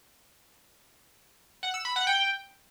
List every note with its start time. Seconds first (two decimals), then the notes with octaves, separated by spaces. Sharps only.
1.63 F#5
1.74 E6
1.85 B5
1.96 F#5
2.07 G5